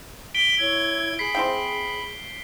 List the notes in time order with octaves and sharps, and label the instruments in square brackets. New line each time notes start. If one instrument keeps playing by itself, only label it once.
[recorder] B6 [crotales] D7 G7
[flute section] E4 C#5 E6 [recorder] G#6
[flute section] G#4 [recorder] B5 [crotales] B6 C7
[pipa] C4 E4 G5